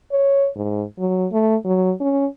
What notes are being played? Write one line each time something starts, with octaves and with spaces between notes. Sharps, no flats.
C#5
G#2
F#3
A3
F#3
C#4